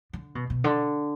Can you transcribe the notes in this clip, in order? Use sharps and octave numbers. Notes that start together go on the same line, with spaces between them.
D3
B2
B2
D3